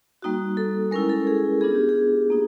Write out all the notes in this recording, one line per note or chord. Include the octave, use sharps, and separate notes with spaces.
G3 A#3 D#4 F#4
A4
G#3 C#4 E4 A#4
A4
G#4
B3 D4 F4 G#4
G4
G#4
A#3 D#4